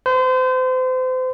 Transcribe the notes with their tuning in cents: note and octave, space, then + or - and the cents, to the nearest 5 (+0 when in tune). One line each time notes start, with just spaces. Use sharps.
C5 -35